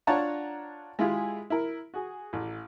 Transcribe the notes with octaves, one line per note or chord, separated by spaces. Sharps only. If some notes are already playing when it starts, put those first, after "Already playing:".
D4 F4 C#5 F#5 A5 A#5
G#3 E4 F4 G4 G#4
E4 A#4
F#4 G#4
A1